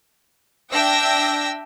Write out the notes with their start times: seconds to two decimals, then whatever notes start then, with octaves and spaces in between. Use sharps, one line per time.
0.71 D4 E5 G5 E6 A#6